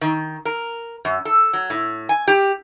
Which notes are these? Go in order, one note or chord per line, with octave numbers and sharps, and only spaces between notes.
D#3
A#4
F#2
A4
F#3
A2
G#5
G4